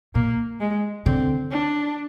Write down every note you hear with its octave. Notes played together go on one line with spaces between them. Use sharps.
A#2 A#3
G#3
D3 C4
D4